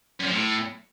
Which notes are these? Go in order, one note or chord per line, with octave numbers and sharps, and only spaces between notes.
F#2
F3
A2